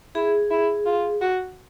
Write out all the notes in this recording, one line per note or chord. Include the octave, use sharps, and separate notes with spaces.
E4 G#4
E4
F4
F#4